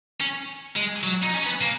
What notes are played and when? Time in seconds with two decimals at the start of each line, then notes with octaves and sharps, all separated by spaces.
0.21 C#4
0.76 G#3
1.04 F#3
1.23 D#4
1.34 C#4
1.46 B3
1.61 A#3